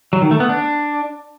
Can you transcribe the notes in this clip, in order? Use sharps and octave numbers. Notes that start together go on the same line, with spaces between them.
F#3
D#3
A3
B3
D4